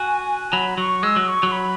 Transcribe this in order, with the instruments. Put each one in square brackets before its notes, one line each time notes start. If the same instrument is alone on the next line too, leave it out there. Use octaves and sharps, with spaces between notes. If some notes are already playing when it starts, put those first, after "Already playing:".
Already playing: [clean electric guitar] F#4 [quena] G#5
[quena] G#5
[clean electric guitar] F#3 [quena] B5
[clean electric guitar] F#3 [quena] C#6
[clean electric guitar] G#3 [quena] E6
[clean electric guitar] F#3
[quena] C#6
[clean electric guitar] F#3
[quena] B5